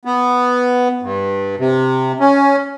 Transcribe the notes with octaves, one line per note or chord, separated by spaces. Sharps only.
B3
G2
C3
C#4